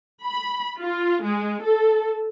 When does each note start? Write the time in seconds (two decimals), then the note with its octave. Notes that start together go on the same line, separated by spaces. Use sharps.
0.23 B5
0.78 F4
1.23 G#3
1.62 A4